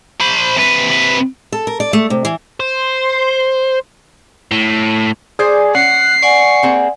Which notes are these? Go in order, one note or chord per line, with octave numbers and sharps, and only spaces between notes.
C5 B5
C3 B4
A4
A#4
D5
A3
C3
E3
C5
A2
G#4 C5 D5
C#4 F#5 C7
D5 F#5 G#5 C#6
A#3 C4 G#4